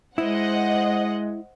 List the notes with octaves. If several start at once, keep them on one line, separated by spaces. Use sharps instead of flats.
G#3 E4 C5 D#5 F#5